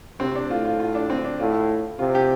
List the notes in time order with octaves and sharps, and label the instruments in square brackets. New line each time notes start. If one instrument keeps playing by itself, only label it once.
[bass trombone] C3 [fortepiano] C4
[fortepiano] D4
[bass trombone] A2 [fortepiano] F4
[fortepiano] F4
F4
D4
C4
D4
[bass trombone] A2 [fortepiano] F4
[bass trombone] C3 [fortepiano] F4
[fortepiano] G4